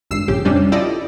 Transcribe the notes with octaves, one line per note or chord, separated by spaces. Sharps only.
G#1 G2 E6 C7
A#1 C#3 G4
F2 C3 G3 C#4 D4
E4 F4 G4 A4 D5 D#5